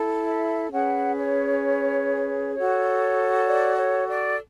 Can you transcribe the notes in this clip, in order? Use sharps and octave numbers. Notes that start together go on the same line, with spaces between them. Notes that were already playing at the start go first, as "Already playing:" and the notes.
Already playing: E4 A4
E5
C#4 G#4 B4 F#5
C#5
F#4 A4 C#5
D5
C#5
D5